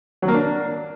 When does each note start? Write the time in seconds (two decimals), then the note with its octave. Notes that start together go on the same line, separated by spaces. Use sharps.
0.22 F#3
0.28 A#3
0.34 D4